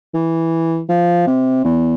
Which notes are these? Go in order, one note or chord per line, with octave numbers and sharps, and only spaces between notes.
E3
F3
C3
E2